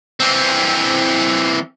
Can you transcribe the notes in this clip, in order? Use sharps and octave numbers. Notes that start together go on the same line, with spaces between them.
E3 C4